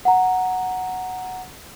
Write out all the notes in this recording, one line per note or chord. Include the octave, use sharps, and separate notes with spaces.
F#5 A#5